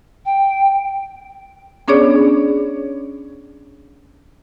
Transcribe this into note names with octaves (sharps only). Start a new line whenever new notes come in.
G5
B3 C#4 D4 G#4 C#5 D5